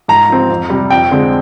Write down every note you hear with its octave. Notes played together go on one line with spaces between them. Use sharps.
G#2 A#5
F3 C4
F2
C3 G3
F2 G5
D3 G#3 C4